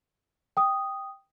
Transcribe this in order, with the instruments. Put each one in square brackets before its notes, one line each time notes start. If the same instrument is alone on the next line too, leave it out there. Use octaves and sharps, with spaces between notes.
[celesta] G5 D#6